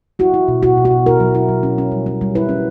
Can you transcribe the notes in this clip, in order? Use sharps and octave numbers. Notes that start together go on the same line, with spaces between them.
E4 F#4
E4
B2
B2 F#4
B2
F#4
B2
E4 A#4
F#3
E4
F#3
C#4
C#4
G3
C#4
G3
E4 B4
C#4